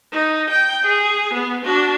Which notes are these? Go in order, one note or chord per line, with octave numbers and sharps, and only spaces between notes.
D#4
G5
G#4
B3
D4 F#4